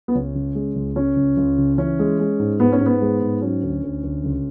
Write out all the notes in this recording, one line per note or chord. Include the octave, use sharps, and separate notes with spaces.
B3
C#2 C#4
C#3
G#3
C#2
C#3 C#4
C#2
C#2
C#3
E3 C#4
G#3
G#3
G#2
G#2 B3
C#4
G#2
B3
G#3
G#2
F#3 C#4
D2
D2
D2
C#2